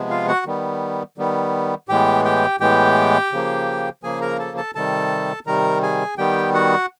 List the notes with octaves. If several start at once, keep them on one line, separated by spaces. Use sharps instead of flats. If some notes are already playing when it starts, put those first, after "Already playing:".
Already playing: C3 F3 G#3 B3
F4 F5
F#4 F#5
D#3 G3 B3
D#3 G3 B3
A2 E3 G#3 B3 G4 G5
G4 G5
A2 E3 G#3 B3 G4 G5
C#3 F3 A#3
C#3 F3 A#3 G#4 G#5
A#4 A#5
A4 A5
A4 A5
C3 D#3 G3 A4 A5
C3 D#3 G3 A#4 A#5
G#4 G#5
D#3 G3 B3 G4 G5
F#4 F#5